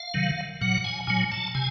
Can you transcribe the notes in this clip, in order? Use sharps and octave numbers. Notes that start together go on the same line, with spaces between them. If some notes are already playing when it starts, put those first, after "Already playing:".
Already playing: F5
C3 D#3 F#3
A#2 F#3 F#5
G#5
A#2 F#3 G#5
A5
C3 G#5